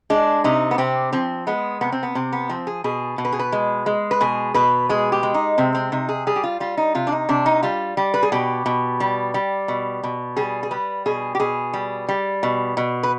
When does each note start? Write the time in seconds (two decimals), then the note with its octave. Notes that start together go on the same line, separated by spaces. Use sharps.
0.10 G#3 D4
0.44 C3 D#4
0.71 B3
0.78 C3 C4
1.13 F3 C4
1.47 G#3 B3
1.81 C3 B3
1.92 C4
2.03 B3
2.15 C3 C4
2.33 B3
2.49 F3 C4
2.67 G#4
2.84 B2 G#4
3.18 B2
3.25 B4
3.33 G#4
3.39 B4
3.52 G#3
3.86 G#3
4.11 B4
4.21 B2 G#4
4.54 B2 B4
4.89 G#3 G#4
5.12 G4
5.23 G#3
5.34 D#4
5.58 C3 C4
5.75 C4
5.92 C3 D#4
6.09 G#4
6.27 G3 G#4
6.36 G4
6.43 F4
6.60 G3 F4
6.77 D#4
6.95 C3 F4
7.07 D4
7.12 D#4
7.29 C3 D4
7.46 D#4
7.63 G3 F4
7.97 G3
8.14 B4
8.23 G#4
8.32 B2 G4
8.66 B2
9.00 G3
9.34 G3
9.68 B2
10.03 B2
10.37 G3 G#4
10.63 G#4
10.71 G3 B4
11.06 B2 G#4
11.35 G4
11.40 B2 G#4
11.73 G3
12.09 G3
12.43 B2
12.77 B2
13.03 B4